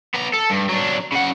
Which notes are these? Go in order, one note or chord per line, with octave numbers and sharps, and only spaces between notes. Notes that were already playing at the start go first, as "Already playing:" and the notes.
B3 A#5
A4
G2
F#3 D4
C#3 F#5